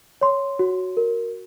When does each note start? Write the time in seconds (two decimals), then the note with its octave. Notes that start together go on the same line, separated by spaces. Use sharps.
0.21 C#5 C6
0.59 F#4
0.97 A#4